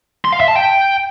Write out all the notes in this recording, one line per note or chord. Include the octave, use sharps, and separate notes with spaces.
C6
F5
E5
A5
G5